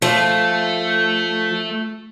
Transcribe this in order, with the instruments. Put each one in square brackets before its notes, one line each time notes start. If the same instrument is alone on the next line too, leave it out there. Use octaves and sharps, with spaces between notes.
[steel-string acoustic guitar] F3 [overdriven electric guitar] A3